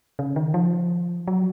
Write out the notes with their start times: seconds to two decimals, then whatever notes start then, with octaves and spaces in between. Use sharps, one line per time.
0.19 C#3
0.36 D#3
0.54 F3
1.28 F#3